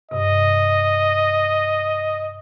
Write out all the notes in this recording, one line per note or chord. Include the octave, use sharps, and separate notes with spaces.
G2 C3 D#5